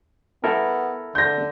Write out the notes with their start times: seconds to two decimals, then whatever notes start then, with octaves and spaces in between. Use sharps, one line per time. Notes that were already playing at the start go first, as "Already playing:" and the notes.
0.44 B3 E4 A4 A#4
1.15 D3 G6 A#6